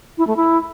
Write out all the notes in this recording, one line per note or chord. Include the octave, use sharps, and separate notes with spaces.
E4
A3
E4